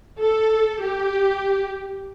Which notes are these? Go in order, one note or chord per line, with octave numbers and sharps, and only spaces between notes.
A4
G4